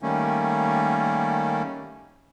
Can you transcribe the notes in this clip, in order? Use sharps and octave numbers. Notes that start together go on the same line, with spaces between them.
D#3 G3 A3 A#3 C#4